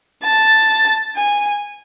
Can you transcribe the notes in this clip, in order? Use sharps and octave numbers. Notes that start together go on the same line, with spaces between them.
A5
G#5